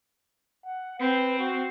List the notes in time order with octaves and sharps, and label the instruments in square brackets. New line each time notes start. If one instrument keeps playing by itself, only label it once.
[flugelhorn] F#5
[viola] C4 [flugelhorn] B4
[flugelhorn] F#4